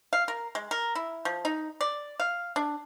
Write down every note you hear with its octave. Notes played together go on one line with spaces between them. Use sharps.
F5
A#4
G#3
A#4
E4
F3
D#4
D5
F5
D4